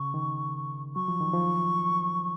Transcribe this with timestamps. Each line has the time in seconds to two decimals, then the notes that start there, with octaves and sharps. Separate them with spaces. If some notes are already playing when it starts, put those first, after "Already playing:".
Already playing: C#3 C#6
0.14 D#3
0.95 F#3 C#6
1.08 F3
1.21 D#3
1.34 F3